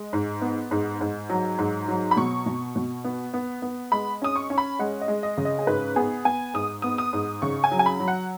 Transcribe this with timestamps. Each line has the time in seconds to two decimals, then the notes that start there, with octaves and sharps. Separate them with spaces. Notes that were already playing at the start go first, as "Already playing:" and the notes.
Already playing: G#3
0.13 G#2
0.42 B3
0.71 G#2
1.01 G#2
1.30 F#3
1.58 G#2
1.88 F#3
2.11 B5
2.17 B2 C#6
2.46 B2
2.76 B2
3.04 B3
3.34 B3
3.62 B3
3.92 G#3 B5
4.22 C#4 D#6
4.36 C#6
4.50 C#4
4.58 B5
4.79 G#3 F#5
5.01 D#5
5.08 G#3
5.23 D#5
5.38 C#3
5.45 D#5
5.59 G#4
5.67 G#2 B4
5.96 B3 G#4
6.25 B3 G#5
6.54 G#2 D#6
6.82 B3 D#6
6.98 D#6
7.13 G#2
7.42 C#3 C#6
7.64 G#5
7.71 F#3
7.79 G#5
7.86 B5
8.00 F#3
8.08 F#5